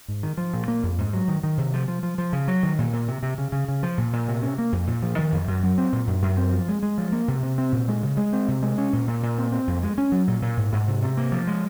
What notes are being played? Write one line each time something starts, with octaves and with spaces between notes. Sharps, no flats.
G#2
D#3
F3
A#2
A#3
F2
G#2
F#3
D#3
D#3
C3
F3
F3
F3
F3
C#3
F#3
D#3
A#2
A#2
C3
C3
C#3
C#3
C#3
F3
A#2
A#2
C3
C#4
A#3
F2
A#2
F3
D#3
F2
F#2
F#3
C4
A#2
F#2
F#2
C4
F3
G#3
G#3
F3
A#3
C3
C3
C4
A#2
G#3
C#3
G#3
C4
C3
G#3
C#4
A#2
A#2
A#2
C4
C4
F2
G#3
C#4
F#3
A#2
A#2
G#2
G#2
C3
C3
A#3
F3
G#3